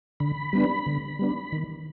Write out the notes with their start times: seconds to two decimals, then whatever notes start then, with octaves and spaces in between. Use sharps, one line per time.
0.20 D3 B5
0.53 G3 B3 D4
0.86 D3
1.19 G3 B3 D4
1.52 D#3